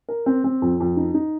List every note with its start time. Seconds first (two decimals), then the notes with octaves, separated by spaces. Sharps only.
0.09 A#4
0.26 C4
0.44 C4
0.62 F2
0.80 F2
0.97 D#4
1.14 D#4